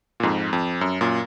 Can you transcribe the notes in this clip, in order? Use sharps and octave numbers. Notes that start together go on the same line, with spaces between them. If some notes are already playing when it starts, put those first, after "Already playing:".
A#2
F2 G#2
F2
F#2
F#2 A#2